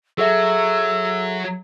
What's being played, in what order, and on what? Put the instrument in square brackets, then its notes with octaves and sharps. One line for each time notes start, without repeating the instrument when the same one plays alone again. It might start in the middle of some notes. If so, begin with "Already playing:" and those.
[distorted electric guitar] F#3 [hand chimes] G#4 A4 E5 [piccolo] E6